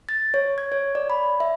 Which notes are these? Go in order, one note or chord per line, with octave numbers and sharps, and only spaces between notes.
A6
C#5
G#6
C#5
D5
B5
E5